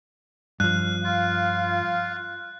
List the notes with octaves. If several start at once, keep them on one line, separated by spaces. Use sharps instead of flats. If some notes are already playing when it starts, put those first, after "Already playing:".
G2 F3 F5 F#6
F4 F5